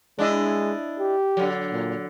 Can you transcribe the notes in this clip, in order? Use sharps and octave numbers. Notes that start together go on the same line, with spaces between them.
G#3 D4 E4 D#5
G4
D3 F#3
A#2